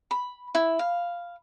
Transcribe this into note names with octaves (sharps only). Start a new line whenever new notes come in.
B5
E4
F5